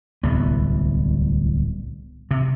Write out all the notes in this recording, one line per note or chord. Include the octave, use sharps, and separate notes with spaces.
D1 C2 B3
C3